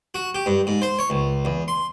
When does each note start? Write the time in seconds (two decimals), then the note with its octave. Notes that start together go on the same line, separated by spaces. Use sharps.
0.14 F#4
0.35 G4
0.46 G2
0.67 G#2
0.82 C5
0.99 C#5
1.10 C#2
1.45 E2
1.68 C6